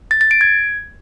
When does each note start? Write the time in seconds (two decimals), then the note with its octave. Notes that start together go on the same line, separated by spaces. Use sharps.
0.11 A6
0.21 A6
0.31 D7
0.41 G#6